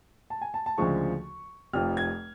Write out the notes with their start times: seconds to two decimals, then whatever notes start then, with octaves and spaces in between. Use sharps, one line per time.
0.30 A5
0.41 G#5
0.54 A5
0.66 A5
0.78 D2 C#3 F3 G#3 C#6
1.73 F1 F2 F3 F6
1.97 G#6